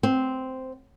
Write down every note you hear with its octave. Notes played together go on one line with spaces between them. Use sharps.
C4